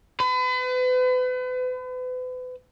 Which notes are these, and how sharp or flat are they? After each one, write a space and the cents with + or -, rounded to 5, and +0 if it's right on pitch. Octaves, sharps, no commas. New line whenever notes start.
B4 +40